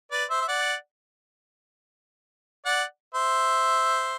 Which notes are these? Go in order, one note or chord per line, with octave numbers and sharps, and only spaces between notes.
B4 D5
C5 E5
E5
D5 F#5
D5 F#5
C5 E5